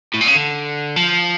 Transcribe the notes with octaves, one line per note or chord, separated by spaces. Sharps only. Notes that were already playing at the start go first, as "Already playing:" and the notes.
A2
A#2
C#3
D3
F3